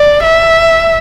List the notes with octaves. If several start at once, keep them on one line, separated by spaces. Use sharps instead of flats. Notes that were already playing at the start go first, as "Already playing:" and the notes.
Already playing: D5
E5